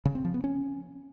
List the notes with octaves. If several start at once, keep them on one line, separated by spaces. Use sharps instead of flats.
C#3
C4
F3
B3
C#4